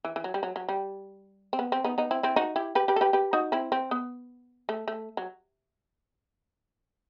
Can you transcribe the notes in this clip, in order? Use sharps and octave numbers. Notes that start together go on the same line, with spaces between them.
E3
E3
F#3
G3
F#3
F#3
G3
C4
B3
C4
B3 D#4
B3 D#4
C4 E4
C4 E4
D#4 F#4
E4 G4
G4 B4
G4 B4
A4
G4 B4
G4 B4
D#4 F#4
C4 E4
C4
B3
A3
A3
F#3